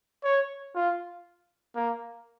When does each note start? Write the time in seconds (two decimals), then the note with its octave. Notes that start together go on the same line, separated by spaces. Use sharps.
0.24 C#5
0.75 F4
1.76 A#3